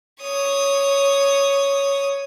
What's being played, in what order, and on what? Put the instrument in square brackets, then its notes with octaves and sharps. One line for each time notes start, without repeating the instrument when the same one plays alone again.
[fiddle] C#5 D#6